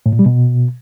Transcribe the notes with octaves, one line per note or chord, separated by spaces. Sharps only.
A2
A#2
G3
B2